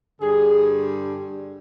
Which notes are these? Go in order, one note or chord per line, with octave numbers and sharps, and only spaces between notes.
G2 D3 G3 G#4